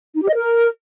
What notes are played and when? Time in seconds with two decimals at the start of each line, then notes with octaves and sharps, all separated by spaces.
0.15 D#4
0.22 G4
0.28 D#5
0.35 A#4